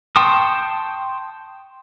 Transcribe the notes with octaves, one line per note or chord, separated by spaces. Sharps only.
G5 A5 C6 C#6 D#6